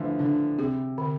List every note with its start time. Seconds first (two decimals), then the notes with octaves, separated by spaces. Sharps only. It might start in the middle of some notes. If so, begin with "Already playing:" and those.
Already playing: D3 E3 F3 A3
0.19 D3 D4
0.58 C3 G#4
0.98 D3